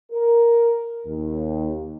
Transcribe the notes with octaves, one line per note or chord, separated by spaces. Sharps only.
A#4
D#2